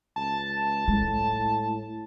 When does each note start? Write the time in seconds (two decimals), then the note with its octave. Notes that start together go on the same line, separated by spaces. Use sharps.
0.16 C#2 A5
0.88 A2 G#3